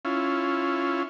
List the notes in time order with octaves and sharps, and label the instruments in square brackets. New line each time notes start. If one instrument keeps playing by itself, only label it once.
[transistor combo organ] C#4 E4 F4